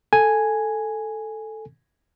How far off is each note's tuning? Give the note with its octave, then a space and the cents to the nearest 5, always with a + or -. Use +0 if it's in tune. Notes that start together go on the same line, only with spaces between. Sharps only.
A4 +0 G#5 +0